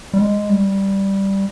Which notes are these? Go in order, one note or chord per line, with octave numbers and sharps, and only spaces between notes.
G3
G#3
G3